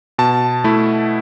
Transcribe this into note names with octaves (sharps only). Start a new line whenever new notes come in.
B2 A5
A3 E4